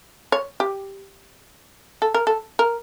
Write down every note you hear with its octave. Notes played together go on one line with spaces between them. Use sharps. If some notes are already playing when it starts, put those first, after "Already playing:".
C#5
G4
A4
A#4
A4
A#4